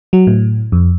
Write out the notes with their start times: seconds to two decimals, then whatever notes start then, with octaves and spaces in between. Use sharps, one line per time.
0.13 F#3
0.27 A2
0.72 F2